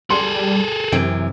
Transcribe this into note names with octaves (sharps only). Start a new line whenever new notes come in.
G3 G#4 A4 C6
F#2 C3 E3 G5